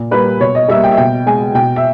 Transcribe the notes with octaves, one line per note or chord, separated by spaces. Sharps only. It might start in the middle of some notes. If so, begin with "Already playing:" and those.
Already playing: A#2
G3 A#3 B4
B2 C#5
D#5
G3 A#3 E5
G5
E5
B2 G5
G#3 G#5
B2 G5
E5